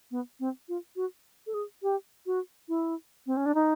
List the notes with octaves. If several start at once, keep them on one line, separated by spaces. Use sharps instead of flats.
B3
C4
F4
F#4
A4
G#4
G4
F#4
E4
C4
C#4
D4
D#4